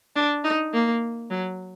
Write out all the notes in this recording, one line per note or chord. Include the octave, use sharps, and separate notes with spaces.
D4
D#4
A#3
F#3